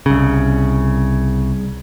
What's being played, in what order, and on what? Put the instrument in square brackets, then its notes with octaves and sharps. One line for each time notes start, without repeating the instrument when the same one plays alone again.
[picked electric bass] C2 C#3